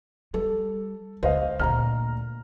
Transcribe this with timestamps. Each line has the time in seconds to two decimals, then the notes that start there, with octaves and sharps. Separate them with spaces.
0.34 G3 A4
1.23 C#2 C5 D#5 F5
1.60 D2 A#2 A#5 F6